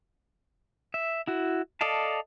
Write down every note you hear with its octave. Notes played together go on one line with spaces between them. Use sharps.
E5
E4 F#4
A4 D5 D#5 F5 A5